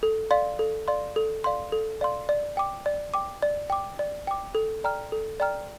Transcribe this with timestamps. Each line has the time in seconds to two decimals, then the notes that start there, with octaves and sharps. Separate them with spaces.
0.03 A4
0.31 D5 F5 C6
0.59 A4
0.88 D5 F5 C6
1.16 A4
1.44 D5 F5 C6
1.72 A4
2.01 D5 F5 C6
2.29 D5
2.57 G5 D6
2.86 D5
3.14 G5 D6
3.43 D5
3.70 G5 D6
3.99 D5
4.27 G5 D6
4.55 A4
4.84 D5 G5 A#5 F6
5.12 A4
5.40 D5 G5 A#5 F6